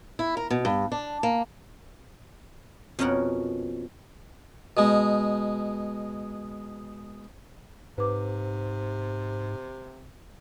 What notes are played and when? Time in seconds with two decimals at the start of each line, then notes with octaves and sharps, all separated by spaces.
0.19 E4
0.37 A#4
0.51 B2
0.65 G2
0.92 D4
1.23 A#3
2.99 F2 B2 C#4 A#4 F#5
4.77 B2 G#3
7.98 G#2 C3 B4 D6